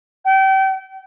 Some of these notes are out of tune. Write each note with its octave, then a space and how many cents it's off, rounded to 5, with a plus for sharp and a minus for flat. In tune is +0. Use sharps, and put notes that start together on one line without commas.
G5 -30